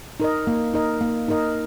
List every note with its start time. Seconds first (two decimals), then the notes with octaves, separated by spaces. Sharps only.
0.20 D#4 A#4 D#5
0.47 A#3
0.74 D#4 A#4 D#5
1.01 A#3
1.28 D#4 A#4 D#5